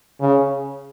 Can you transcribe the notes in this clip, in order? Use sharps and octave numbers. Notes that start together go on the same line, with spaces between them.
C#3